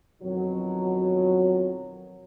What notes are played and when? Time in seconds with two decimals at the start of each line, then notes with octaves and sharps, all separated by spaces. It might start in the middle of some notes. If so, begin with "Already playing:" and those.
0.22 F2 B2 D#3 F#3